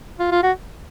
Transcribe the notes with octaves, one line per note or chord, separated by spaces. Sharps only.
F4
F4
F#4